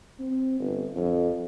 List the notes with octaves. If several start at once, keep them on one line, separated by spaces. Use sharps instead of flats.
C4
G1
F2